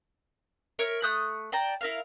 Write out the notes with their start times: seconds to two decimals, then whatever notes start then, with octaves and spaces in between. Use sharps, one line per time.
0.79 A#4 C#5 E5
1.02 A3 D#6 F#6 G6
1.52 D5 G5 A5 A#5
1.81 E4 A#4 F5